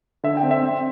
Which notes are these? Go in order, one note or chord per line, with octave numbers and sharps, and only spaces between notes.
D3 E5
G5
C4
E5
C4